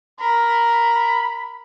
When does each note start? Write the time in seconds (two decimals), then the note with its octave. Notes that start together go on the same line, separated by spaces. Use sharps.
0.20 A#4 B5